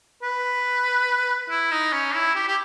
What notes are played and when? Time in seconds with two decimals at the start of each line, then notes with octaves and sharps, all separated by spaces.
0.23 B4
1.50 E4
1.71 D#4
1.93 C#4
2.14 E4
2.36 G4
2.48 G4